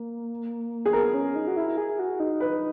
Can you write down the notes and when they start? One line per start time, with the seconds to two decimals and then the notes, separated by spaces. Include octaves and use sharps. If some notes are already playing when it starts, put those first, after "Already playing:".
Already playing: A#3
0.86 G#4
0.93 B3 A#4
1.14 C#4
1.36 D#4
1.48 F#4
1.57 E4
1.77 G#4
1.99 F#4
2.20 D#4
2.40 B4